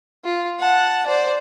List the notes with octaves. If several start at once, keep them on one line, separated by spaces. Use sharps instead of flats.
F4
F#5 A5
C5 D5